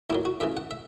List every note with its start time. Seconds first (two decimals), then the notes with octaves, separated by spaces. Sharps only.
0.10 D#2 D#3 F#3 E4
0.25 F#4
0.40 F#2 C#3 E3 E5
0.57 F#5
0.71 E5